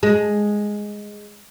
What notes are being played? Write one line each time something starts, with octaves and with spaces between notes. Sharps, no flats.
G#3